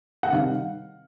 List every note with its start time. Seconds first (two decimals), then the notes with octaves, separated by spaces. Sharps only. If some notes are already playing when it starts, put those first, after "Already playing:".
0.23 F#5
0.32 C3 D#3 G3 F5